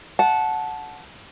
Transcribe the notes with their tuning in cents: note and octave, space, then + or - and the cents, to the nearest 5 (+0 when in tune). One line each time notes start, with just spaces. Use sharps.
F#5 -10 A5 -15